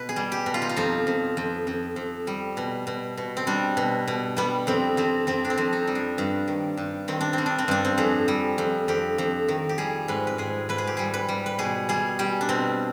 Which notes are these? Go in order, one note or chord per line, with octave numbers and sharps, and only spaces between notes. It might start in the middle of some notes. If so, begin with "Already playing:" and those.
Already playing: B2 B4
G#4
G3
G4
B2
F4
D#4
F4
F2 D#4
F2
F2
F2
F2
G3
B2
B2
B2
C4
G3 D4
B2
B2
G3 B3
F2 C4
F2 C4
F2 C4
D4
C4
F2
D#4
G3
D4
G2
D#3
G2
D#3 C4
D4
G3 C4
D4
C4
G2 D4
C4
F2 G#4
G3
F2
F2 G4
F2
D#3
G4
G3 G#4
G#2 B4
B4
G#2 G#4
G#2 B4
G#4
G4
G3 G#4
B4
G3
B4
B2 G#4
G3 G#4
G3 G4
D4
B2 C4